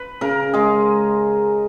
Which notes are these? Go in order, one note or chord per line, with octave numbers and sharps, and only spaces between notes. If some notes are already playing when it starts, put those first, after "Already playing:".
Already playing: B4
C#3 A#4
G#3 G#4